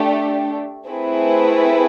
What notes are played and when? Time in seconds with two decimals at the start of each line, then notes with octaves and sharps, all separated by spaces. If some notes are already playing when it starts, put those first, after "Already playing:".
Already playing: A3 D4 G4
0.88 A3 C4 E4 G#4 B4